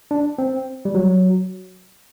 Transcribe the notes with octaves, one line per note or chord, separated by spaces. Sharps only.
D4
C4
G3
F#3